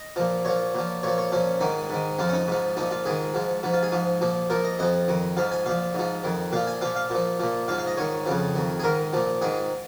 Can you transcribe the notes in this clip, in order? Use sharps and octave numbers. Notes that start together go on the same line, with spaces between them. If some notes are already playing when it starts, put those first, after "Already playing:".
Already playing: D#5
A#2 F3
A#2 F3 C#5
A#2 F3
A#2 F3 C#5
C#5
A#2 F3 C#4
G#2 D#3 D#4
G#2 D#3
F2 F3 F4
C#4
D#4
G#2 F3
A#2 F3 D#4
F4
G#2 D#3 G#4
G#2 F3
G#2 F3
F4
G#4
G#2 F3
A#2 F3
A#2 F3 A#4
D#5
F2 F3 D#5
F2 D#3
G#2 F3 F5
G#5
A#2 F3 F5
G#2 F3
F2 D#3
A#2 F3 F5
G#5
A#2 F3 F5
F5
A#2 F3
A#2 F3
G#2 F3 F5
F5
D#5
G#2 D#3 C#5
F2 C#3 F3
F2 D#3
G#4
G#2 D#3 A#4
A#2 F3
G#2 D#3 G#4